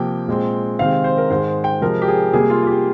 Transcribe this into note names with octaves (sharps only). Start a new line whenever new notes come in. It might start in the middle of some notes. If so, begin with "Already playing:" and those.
Already playing: C3 F3 A#3 G5
A#2 G#3 C4
C3 D#3 G#3 C4 F5
C5
A#4
G#2 D#3 G#3 C5
G5
C3 F3 G#3 A#4
G4
G#4
C3 G3 A#3 G#4
F4
F4
G4